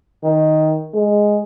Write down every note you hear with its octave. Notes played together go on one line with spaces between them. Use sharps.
D#3
G#3